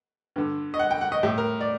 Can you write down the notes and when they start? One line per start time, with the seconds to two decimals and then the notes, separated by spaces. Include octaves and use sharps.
0.36 G2 D3
0.74 D#5
0.79 F#5
0.91 G5
1.01 F#5
1.12 D#5
1.23 A2 G4
1.38 A#4
1.61 D5